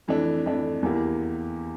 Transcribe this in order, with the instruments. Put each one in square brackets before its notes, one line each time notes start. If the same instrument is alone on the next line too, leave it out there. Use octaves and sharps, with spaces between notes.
[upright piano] F2 E3 A3 D4
F2 E3 A3 D4
E2 E3 A#3 E4 G4